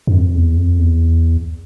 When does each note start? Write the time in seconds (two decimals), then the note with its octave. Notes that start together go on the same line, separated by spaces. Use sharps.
0.07 F#2
0.13 F2
0.35 E2
0.57 F2
0.79 E2